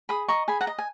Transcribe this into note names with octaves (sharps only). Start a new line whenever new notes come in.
G#4 B5 D#6
D#5 A#5 C#6
G#4 G#5 B5
F#5 A#5
D#5
G#5